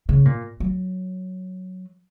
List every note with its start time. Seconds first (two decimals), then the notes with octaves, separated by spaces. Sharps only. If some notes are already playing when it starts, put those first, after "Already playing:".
0.09 C#3
0.25 A#2
0.60 F#3